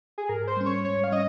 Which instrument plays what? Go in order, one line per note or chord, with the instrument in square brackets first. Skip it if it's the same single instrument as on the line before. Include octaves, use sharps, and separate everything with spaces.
[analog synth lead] G#4
[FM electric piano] G#2 [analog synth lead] A#4
[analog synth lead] C5
[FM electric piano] G3 C#4
[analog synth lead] C#5
[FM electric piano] G#2 [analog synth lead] C#5
[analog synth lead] F5
[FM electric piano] G3 C#4 [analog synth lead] D#5